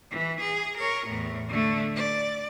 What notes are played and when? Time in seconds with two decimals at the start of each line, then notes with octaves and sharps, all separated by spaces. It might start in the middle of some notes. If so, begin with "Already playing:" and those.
0.11 E3
0.41 G#4
0.78 A#4 C#5
1.07 E2 A2
1.48 D3 A3
1.96 D5